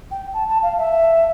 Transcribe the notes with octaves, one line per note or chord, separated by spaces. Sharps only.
G5
A5
A5
F5
E5